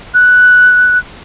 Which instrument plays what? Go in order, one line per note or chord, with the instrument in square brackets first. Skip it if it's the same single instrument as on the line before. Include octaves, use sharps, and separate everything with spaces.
[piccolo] F#6